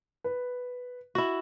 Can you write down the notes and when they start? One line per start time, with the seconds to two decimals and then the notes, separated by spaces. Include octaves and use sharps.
0.24 B4
1.15 E4 F#4